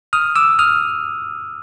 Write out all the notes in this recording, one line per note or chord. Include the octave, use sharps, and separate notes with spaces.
D#6 F6
D6 E6
D#6 F6